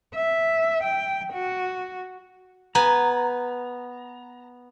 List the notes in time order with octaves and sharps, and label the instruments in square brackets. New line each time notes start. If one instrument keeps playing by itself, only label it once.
[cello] E5
G5
F#4
[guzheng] B3 G#5 [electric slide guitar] A#5